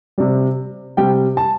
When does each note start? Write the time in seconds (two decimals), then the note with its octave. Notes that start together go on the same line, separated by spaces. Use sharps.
0.18 C3 G3 D5
0.97 C3 G3 G5
1.37 A5